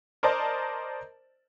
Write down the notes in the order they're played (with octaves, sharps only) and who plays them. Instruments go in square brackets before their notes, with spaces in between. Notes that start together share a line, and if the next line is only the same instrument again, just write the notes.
[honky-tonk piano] A#4 C5 D5 D#5 A5